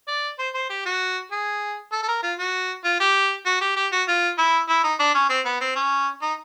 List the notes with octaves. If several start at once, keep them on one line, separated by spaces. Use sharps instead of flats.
D5
C5
C5
G4
F#4
G#4
A4
A4
A#4
F4
F#4
F4
G4
F#4
G4
G4
F#4
F4
E4
E4
D#4
D4
C#4
C4
B3
C4
C#4
D#4